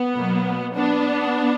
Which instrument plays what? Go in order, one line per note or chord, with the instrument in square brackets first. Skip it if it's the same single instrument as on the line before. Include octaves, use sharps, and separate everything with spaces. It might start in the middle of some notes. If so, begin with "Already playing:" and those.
Already playing: [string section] B3
B2 F#3 A#3
B3 D4